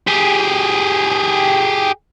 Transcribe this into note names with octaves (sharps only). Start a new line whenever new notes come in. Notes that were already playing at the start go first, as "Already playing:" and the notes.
G4 G#4